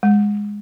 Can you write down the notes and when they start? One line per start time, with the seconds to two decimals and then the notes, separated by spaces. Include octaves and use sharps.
0.03 G#3